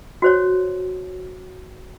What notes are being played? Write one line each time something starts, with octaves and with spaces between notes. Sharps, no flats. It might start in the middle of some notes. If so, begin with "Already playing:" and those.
F#4 C5 C#5